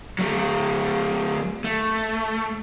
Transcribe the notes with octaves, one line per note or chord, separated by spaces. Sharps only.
F#3 A3
A3